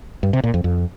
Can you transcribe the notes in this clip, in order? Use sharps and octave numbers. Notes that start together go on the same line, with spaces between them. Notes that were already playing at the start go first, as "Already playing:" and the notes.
G2
C3
A#2
F2
F2